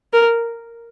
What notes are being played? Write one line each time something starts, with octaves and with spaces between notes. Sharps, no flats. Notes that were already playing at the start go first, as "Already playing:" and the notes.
A#4